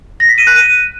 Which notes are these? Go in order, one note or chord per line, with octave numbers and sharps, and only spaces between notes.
A#6
B6
D#7
F#6
D#7